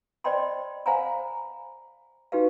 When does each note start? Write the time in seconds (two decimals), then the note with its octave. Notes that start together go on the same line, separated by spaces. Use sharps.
0.24 C5 D5 D#5 G5 B5 C6
0.86 C5 F5 F#5 G#5 A#5 B5
2.32 D#4 F#4 G4 B4 F5